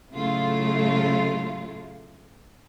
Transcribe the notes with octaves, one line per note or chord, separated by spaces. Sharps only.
A2 C#3 F#3 A3 E4 F4